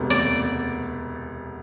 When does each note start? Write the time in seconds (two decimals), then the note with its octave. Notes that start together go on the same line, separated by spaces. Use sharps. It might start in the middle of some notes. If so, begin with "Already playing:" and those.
Already playing: E1 D2 C3 G3 B3
0.10 D5